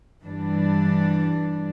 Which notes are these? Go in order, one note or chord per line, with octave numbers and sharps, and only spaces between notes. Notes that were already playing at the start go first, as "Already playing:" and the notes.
G2 E3 G3 D4